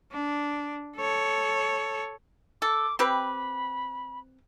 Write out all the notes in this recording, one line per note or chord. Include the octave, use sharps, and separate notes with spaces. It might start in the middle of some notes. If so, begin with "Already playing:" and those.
D4
A4 C#5
A4 D6
C4 G4 B4 B5